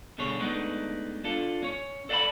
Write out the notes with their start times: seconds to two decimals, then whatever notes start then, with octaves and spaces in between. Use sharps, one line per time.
0.18 B2 D3 G3 G#4 C#5
0.39 G#3 A3 B3 D4 D#4
1.24 D4 F4 A4
1.63 C#4 C#5
2.09 A4 D5 F5 F#5 A5 B5